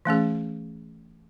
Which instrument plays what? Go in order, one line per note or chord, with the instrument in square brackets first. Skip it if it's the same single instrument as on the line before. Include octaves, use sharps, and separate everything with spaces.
[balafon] E3 A3 C#4 G#4